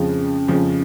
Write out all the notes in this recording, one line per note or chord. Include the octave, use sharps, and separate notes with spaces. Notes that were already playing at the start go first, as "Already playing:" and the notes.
Already playing: F2 C#3 F3 G#3
F2 C#3 F3 G#3